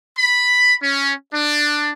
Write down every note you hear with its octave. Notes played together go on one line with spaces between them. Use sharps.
B5
C#4
D4